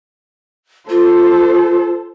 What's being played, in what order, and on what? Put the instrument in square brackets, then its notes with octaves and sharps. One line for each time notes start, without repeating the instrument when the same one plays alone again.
[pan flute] F4 [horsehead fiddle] A4 C5